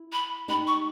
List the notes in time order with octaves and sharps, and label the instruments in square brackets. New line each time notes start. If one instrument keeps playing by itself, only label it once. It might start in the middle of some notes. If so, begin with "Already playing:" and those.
Already playing: [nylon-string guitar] E4
[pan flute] B5
[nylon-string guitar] D#4 G4 [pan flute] B5
[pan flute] C#6